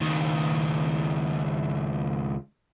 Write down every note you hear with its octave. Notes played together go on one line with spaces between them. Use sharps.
C#2 D#3